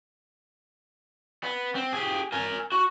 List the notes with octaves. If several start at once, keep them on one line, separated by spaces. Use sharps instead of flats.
B3
C4
G4 G#4
A#4 G#5
F#4